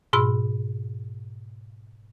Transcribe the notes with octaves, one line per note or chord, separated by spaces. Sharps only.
G#2 B2 G#4 B5 E6